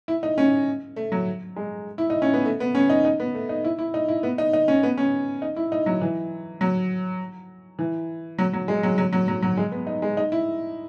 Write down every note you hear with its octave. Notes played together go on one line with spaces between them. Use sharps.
E4
D#4
C#4
A3
F#3
G#3
E4
D#4
C#4
B3
A3
B3
C#4
D#4
D#4
B3
A3
D#4
E4
E4
D#4
E4
B3
D#4
D#4
C#4
B3
C#4
D#4
E4
D#4
F#3
E3
F#3
E3
F#3
F#3
G#3
F#3
F#3
F#3
F#3
F#3
G#3
B3
D#4
G#3
D#4
E4